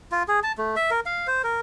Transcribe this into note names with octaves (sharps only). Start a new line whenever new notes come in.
F4
G#4
A5
A3
E5
A#4
F5
C5
A#4